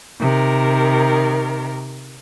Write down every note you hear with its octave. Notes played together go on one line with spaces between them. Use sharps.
C3 D#3 A#4